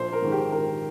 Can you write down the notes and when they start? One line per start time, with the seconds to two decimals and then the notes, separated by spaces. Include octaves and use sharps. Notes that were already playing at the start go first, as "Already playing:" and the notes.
Already playing: A#1 C5
0.12 A#4
0.22 G#2 D#3 G#3
0.32 G4
0.52 A#1 A#4